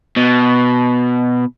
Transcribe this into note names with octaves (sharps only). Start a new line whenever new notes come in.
B2